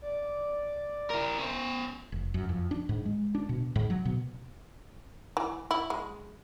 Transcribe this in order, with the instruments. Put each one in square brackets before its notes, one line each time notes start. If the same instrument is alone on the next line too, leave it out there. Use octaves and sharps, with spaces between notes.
[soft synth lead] D5
[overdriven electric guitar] E4 A#4
C#4 C5
[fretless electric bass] F1
F#2
F2
D4
G#2
G#3
D4
B2
G#2
F#3
B2
[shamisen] E3
E4
G#3